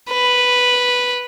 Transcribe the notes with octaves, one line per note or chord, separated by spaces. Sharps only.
B4